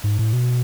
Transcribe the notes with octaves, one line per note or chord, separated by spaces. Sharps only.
G#2
A2
B2